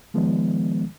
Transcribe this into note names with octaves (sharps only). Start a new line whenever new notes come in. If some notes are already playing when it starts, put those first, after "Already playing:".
D#3 F3 G#3 B3